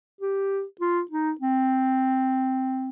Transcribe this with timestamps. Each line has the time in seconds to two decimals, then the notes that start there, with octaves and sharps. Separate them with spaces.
0.21 G4
0.81 F4
1.11 D#4
1.41 C4